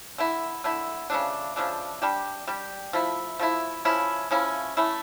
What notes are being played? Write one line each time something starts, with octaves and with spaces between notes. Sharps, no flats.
D3 A3 E4
D3 A3 E4
C#3 F3 A3 D4
C#3 F3 A3 D4
G3 D4 G4
G3 D4 G4
F3 A3 E4
F3 A3 E4
C#3 F3 C#4 E4
C#3 F3 C#4 E4
A3 C#4 E4